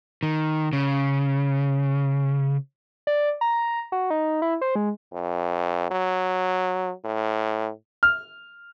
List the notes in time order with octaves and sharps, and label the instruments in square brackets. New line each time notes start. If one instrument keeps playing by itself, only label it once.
[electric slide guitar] D#3
C#3
[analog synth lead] D5
A#5
F#4
D#4
E4
C5
G#3
[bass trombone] F2
F#3
A2
[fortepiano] F6